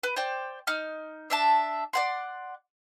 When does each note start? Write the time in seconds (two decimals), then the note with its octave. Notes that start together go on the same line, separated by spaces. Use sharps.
0.03 B4
0.16 C5 D5 G5
0.67 D#4 F6
1.30 D4 E5 A5
1.93 D5 F#5 C6